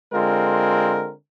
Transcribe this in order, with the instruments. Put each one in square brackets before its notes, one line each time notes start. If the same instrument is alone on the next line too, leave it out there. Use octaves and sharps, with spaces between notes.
[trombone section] D3 G#3 C4 F4 A#4